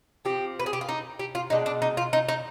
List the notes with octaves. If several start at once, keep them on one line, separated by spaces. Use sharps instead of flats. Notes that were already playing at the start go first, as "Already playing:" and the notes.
F3 C4 G4
B4
G#4
G4
F4
D#4
G4
F4
B2 G#3 D4 D#4
D4
D#4
F4
D#4
D#4